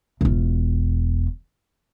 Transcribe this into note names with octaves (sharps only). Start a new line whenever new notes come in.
E1 F4